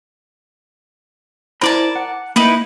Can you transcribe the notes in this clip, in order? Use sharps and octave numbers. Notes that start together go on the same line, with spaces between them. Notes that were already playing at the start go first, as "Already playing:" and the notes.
E4 A#4 C5 D5 A5 B5
F#5
A#3 D#4 E4 B4